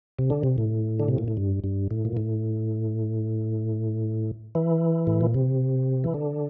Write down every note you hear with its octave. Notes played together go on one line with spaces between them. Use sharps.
C3
D3
C3
A2
D3
C3
A#2
A2
G2
G2
A2
A#2
A2
E3
A2
A#2
C3
E3
D3